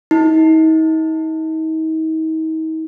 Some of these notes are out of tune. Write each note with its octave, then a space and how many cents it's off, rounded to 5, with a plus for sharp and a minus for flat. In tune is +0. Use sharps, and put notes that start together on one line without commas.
D#4 +40